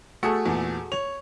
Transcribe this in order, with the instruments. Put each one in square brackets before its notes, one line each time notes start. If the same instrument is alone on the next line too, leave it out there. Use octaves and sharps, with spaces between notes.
[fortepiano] A3 [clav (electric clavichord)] F#4 G#4 A4 [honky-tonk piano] C#7
[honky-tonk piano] E2 A#2
[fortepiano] C#5 [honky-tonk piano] F7